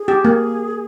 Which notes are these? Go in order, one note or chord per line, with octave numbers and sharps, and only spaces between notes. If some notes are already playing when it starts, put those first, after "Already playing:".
Already playing: G#4
G4
A#3